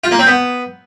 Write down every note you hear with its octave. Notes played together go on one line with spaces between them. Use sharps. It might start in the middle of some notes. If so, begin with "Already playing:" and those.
F4
A#3
C4
B3